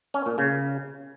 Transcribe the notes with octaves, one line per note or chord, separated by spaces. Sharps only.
C#4
A#2
C#3